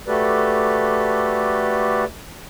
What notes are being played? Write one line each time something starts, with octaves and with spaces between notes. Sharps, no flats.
A3 F#4 G4 A4 B4 D5